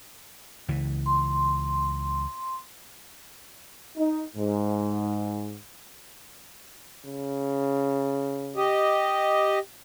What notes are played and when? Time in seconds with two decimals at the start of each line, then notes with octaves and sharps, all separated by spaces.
0.68 C#2 E3
1.06 C6
3.97 D#4
4.37 G#2
7.05 C#3
8.56 G4 D#5